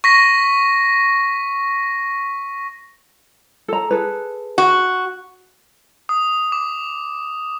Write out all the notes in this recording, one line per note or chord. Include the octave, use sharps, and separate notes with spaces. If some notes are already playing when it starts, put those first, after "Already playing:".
C#6 A#6 B6
A4 A#5
G#4 A4 B4
F#4
D#6
D6